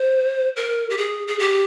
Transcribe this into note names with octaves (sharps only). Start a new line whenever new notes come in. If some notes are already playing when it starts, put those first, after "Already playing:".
Already playing: C5
A#4
G4
G#4
G#4
G4